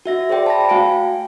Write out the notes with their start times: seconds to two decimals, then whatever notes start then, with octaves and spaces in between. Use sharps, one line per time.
0.06 F#4 E5 A#6
0.29 G#4 C5 D5 G5
0.46 A5 B5 A#6
0.69 A3 F#4 F5 G5 G#5 D7